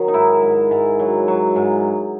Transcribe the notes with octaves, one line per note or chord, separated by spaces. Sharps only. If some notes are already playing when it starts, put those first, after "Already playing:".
Already playing: D#3 F#3
D#4
G#2 E4
G#2
G#2
F#3
F#3
G#2